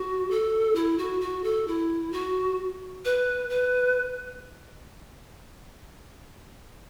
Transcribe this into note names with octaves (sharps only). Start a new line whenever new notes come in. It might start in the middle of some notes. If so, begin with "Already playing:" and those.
Already playing: F#4
A4
E4
F#4
F#4
A4
E4
F#4
B4
B4